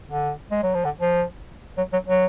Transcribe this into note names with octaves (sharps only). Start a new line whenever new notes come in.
D3
G#3
F#3
F3
D3
F3
F#3
F#3
F#3